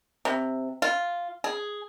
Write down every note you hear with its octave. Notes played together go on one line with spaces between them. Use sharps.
C3
F4
G#4